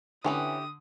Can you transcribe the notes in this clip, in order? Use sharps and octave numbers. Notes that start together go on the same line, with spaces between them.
D3 E3 C#4 E4 G4 B4 D6 D#6